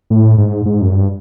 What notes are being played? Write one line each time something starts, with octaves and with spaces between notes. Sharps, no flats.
A2
G#2
G#2
F#2
G2